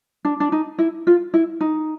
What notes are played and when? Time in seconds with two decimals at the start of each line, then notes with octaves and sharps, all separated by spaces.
0.25 D4
0.40 D4
0.52 D#4
0.78 E4
1.07 F4
1.34 E4
1.61 D#4